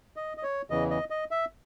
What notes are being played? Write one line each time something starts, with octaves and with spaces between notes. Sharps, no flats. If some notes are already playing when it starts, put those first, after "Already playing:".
D#5
D#5
C#5
E2 C#3 E3 D#5
D#5
D#5
E5